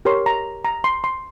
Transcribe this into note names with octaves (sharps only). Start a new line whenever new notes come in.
G4 A#4 C#5 C6
A#5
A#5
C6
C6